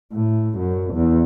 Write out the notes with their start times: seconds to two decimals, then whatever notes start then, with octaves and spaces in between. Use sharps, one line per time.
0.13 A2
0.58 F#2
0.94 E2